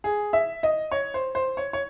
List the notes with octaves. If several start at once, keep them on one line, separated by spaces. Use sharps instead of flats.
G#4
E5
D#5
C#5
C5
C5
C#5
C#5